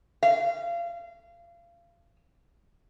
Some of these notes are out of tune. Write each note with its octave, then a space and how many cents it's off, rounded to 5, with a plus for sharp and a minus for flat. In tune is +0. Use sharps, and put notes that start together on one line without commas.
F5 -30